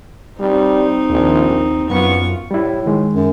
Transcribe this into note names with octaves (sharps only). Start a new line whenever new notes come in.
G3 C4 D#4
A#1 D#2
F#2 B3 F4 C#6
A2 G3 E4
D#3 G#3
F#2